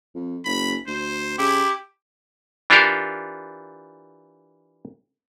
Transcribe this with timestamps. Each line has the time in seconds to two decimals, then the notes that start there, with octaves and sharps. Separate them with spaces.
0.15 F2
0.45 F#1 B5
0.87 D2 C5
1.38 C#3 E4 G4
2.70 E3 D4 F4 G4 A4 A#4